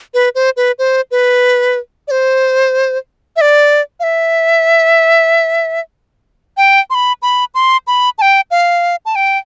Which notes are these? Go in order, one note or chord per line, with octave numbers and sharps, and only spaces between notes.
B4
C5
B4
C5
B4
D5
C5
E5
D5
F5
E5
G5
C6
B5
B5
C6
B5
A5
G5
F5
A5
G5